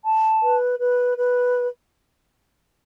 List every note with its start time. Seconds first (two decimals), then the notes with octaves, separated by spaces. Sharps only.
0.04 A5
0.42 B4
0.79 B4
1.17 B4